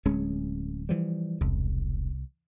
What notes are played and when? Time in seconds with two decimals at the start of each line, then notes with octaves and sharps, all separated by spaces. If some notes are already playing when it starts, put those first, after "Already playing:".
0.05 D1 G#3 C#4
0.89 E3 F3 G3
1.41 E1 C2